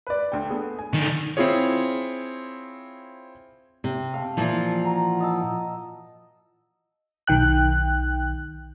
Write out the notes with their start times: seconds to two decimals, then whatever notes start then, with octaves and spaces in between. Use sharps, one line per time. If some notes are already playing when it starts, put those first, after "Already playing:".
0.07 B4 D5
0.32 D2 G5
0.50 B3 G#4 A4
0.79 G#5
0.94 D3 D#3
1.37 C4 E4 F4 G#4 C#5
3.84 C3
4.14 A3 F5
4.37 A#2 E3 F3
4.84 F#4 A#4 A#5
5.20 D#5 A5 E6
7.27 B1 D#3 G5 F#6